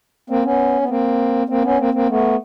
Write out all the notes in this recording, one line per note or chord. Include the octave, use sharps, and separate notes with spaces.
A#3 C4
B3 C#4
B3
A#3 C4
A#3 C4
B3 C#4
A#3 C4
A#3 C4
A3 B3